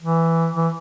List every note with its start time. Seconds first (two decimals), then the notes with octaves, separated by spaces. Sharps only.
0.02 E3
0.56 E3